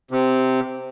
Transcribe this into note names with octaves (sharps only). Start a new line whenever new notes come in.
C3